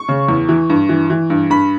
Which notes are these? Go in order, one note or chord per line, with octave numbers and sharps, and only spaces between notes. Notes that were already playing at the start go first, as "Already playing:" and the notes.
Already playing: C#6
C#3
E2
E3
G2
E3
E3
G2
G2 B5